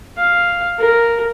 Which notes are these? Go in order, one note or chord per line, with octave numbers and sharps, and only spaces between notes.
F5
A#4